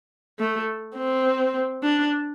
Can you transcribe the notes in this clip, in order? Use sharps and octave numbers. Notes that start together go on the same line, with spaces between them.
A3
C4
D4